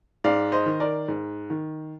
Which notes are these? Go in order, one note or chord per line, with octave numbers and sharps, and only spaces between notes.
G#2 D5 F5
C5 D#5
D#3
A#4 D5
G#2
D#3